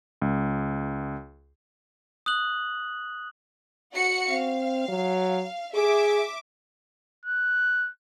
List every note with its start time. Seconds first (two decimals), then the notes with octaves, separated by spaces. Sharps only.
0.22 C#2
2.26 D#6 F#6 F#7
3.94 F#4 F#5 C#7
4.30 C4 F5
4.89 F#3
5.75 G#4 E5 D6
7.26 F#6